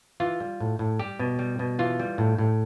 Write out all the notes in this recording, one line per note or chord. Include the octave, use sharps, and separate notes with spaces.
E3 F4
G3
A2
A2
G3 G4
B2
G3
B2
E3 F4
G3
A2
A2